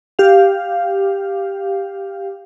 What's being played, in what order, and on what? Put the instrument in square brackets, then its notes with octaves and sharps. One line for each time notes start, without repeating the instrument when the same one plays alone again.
[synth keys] G4 F5